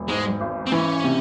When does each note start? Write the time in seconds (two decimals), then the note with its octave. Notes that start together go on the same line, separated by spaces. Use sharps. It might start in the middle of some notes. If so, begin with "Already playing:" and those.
Already playing: E1
0.08 G#2 G#3
0.41 G#1
0.67 C4
0.72 E3 C#4
1.04 C3